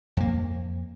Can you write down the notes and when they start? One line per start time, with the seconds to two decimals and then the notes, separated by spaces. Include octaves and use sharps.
0.17 F2 A#3